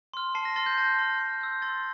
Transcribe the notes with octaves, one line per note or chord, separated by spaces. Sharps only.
C6 F6
A5 C7
A#6
C6 F6 A6
G6
A5
C6 F6
C6
E6 G6
C6 A6